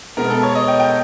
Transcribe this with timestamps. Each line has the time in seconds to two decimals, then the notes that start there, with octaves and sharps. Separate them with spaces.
0.17 B2 G#3 B3 A#4
0.30 A4
0.43 C#5
0.55 D#5
0.68 G5
0.80 G5